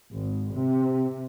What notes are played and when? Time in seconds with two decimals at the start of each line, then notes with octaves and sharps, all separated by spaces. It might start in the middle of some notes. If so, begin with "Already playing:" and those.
0.12 G#1
0.54 C3